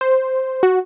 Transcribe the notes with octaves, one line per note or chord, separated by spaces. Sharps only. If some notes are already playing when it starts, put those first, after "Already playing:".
C5
F#4